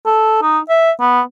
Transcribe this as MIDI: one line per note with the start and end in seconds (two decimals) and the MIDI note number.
0.06 0.40 69
0.42 0.59 63
0.69 0.91 76
1.00 1.21 59